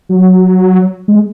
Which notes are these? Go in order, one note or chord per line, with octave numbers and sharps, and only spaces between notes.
F#3
G#3